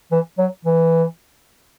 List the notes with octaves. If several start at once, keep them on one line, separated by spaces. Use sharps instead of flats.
E3
F#3
E3